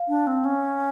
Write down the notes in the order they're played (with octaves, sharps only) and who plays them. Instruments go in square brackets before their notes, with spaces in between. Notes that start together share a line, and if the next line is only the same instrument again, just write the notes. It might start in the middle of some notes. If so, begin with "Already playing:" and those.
Already playing: [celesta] F5
[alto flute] D4
C4
C#4